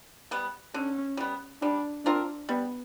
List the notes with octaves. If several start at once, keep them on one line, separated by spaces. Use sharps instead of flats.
G3 B3
D3 C#4
G3 B3
G3 D4
C4 D4 F4 A#4
G3 B3